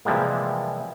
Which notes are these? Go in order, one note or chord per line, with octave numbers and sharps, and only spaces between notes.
C3 E3 F3 G3 G#3 A#3